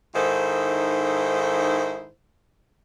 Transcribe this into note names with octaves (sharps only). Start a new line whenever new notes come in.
G#2 D#3 E4 A4 C5